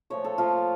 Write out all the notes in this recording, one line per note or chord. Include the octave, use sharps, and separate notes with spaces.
A#2 F3 A3 C#5
A4
A#2 F3 A3 F4